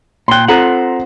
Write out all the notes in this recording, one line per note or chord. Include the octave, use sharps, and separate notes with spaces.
A#2 G5 C6 F#6
C4 F4 A4 C5 F#5 A#5